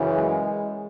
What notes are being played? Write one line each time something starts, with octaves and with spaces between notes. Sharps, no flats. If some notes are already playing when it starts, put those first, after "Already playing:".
Already playing: F#2 C#3 E3
G#3